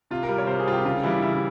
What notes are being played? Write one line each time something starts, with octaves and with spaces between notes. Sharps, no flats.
C3 F4
A#4
G3
C#5
C3 C5
G#4
G3 F4
G4
C#3 F4
E3 G3 E4
C#3 E4